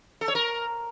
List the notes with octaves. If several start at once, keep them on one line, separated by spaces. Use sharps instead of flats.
A4
C#5
A#4